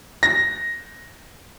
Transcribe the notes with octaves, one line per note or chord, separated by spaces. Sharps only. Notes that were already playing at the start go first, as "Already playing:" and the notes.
A#6